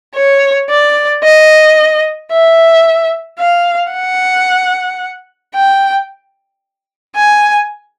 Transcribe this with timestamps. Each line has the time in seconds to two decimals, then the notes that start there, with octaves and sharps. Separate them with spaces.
0.16 C#5
0.70 D5
1.24 D#5
2.32 E5
3.39 F5
3.93 F#5
5.55 G5
7.16 G#5